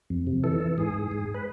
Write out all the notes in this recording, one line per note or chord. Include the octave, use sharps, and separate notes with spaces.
F2
C3
E3 A4
E3
G#2 G#4
G#2
G#2
B4